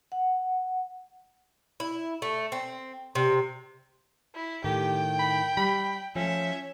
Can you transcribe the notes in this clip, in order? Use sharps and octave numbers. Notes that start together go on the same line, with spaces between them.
F#5
E4
A3
C4
C3
E4
A2 D#3 G4 A4 G5
B5
G3 B5
F3 A3 C#4 E5